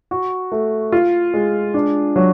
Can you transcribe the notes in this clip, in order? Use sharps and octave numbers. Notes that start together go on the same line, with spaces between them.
F#4
A3
F4
G#3
D4
F#3